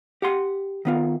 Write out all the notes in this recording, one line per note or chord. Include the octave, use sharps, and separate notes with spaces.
G4 F#5 C6
D#3 B3 F4